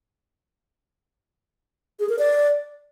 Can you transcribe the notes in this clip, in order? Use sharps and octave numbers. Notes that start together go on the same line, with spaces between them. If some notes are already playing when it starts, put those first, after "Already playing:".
G#4
A#4
D5